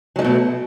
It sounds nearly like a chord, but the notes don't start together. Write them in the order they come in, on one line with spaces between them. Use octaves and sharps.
F#3 G#3 A3 B2